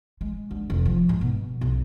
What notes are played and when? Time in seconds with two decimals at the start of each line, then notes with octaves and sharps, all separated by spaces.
0.21 G#3
0.51 D2
0.70 F1
0.85 F3
1.09 G#2
1.21 B2
1.61 B1